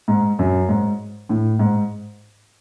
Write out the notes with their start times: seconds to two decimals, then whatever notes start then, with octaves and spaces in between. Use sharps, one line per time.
0.08 G#2
0.39 F#2
0.69 G#2
1.29 A2
1.59 G#2